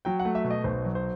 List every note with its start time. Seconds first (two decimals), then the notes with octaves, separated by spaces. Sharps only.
0.05 F#3 G5
0.20 F#5
0.25 A3
0.35 E5
0.44 B2
0.50 D#5
0.64 B1 C5
0.84 F#3
0.95 C5